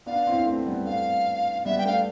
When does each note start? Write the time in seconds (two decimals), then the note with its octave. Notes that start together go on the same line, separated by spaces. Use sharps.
0.06 B3 D4 F5
0.27 C4 E4
0.46 A3 C4
0.66 G3 B3
0.85 A3 F5
1.65 G3 B3 E5
1.78 G5
1.85 A3 F5